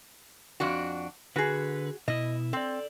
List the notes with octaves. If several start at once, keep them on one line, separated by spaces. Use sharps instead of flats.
F2 D4 F#4
D3 F#4 G#4 B4
B2 E4 D#5
C4 A4 D5